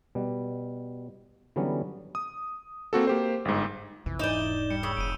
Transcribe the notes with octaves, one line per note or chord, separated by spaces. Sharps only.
B2 G3
D3 E3 F#3 G3 B3 C#4
D#6
A#3 C4 F#4 A4
A#3 G4 C5
G1 G#2
A#1 F2 C3 E3
E1 G#2 D4 D#4 D5 G6 E7 G7
G3 C#7
C#3 D#6 E6
F1 D7 D#7